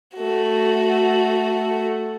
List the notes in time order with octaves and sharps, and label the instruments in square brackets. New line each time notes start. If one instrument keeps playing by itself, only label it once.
[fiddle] A3 F#4